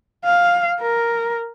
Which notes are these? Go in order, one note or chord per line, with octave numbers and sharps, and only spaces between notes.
F5
A#4